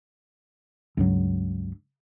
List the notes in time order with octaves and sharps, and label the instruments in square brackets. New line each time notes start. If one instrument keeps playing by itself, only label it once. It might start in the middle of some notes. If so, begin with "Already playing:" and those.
[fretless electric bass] C#2 G2 F#3